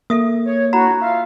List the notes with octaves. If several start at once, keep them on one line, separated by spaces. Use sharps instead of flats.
A#3 A4 E5 D#6
C#5
D4 E4 F#4 F#5 A#5 B5
F4 E5 F5